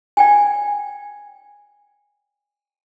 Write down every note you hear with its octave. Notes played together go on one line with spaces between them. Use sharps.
D5 G5 G#5